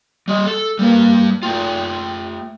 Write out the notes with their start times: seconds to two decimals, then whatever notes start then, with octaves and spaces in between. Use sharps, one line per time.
0.28 G3 D#5
0.46 A4
0.79 G3 A#3 B4
1.43 A3 F4 G5